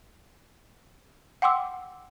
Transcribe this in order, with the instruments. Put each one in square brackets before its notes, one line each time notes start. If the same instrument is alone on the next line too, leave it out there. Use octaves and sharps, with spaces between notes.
[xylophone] F#5 G5 C6 D6 E6